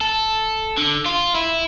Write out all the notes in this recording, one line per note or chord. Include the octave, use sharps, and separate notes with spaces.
A4
D3
F4
E4